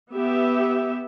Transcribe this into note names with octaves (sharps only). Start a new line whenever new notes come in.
B3 G4 E5